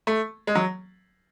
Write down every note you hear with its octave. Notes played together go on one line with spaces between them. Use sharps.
A3
G#3
F#3